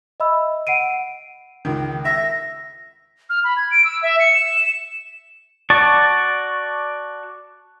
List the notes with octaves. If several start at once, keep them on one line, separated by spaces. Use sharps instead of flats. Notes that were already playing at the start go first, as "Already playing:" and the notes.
D#5 E5 B5 E6
F#5 C7 D7 D#7
C#2 D#3
E5 A#6
F6
B5
G#6
D7
E6
E5
C#7
E7
F#4 D5 A5 C#6